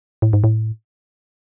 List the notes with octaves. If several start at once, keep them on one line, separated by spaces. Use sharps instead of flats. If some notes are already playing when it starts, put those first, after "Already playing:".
A2
G#2
A2